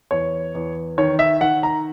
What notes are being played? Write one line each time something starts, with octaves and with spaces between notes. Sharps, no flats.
E2 C#5
E2
D#3 C#5
E5
D#3 F#5
A#5